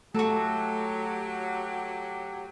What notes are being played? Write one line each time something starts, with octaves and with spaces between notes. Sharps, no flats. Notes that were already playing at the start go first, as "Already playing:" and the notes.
F#3 A3 F#4 G4 A4